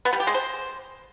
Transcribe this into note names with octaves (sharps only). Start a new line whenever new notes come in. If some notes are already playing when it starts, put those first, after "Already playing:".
B3
G3
G4
G#3
C5